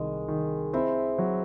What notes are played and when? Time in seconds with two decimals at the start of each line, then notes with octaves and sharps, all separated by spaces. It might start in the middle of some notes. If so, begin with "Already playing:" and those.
Already playing: C2 D#3 G#3
0.28 D#3
0.73 C4 E4
1.18 F#3